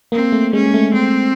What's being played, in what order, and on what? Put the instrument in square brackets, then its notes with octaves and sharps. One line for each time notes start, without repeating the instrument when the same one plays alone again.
[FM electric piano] A#3 [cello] C4
[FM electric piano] A3
[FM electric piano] G#3 [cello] C#4
[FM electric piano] A3
[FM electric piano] A3 [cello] C4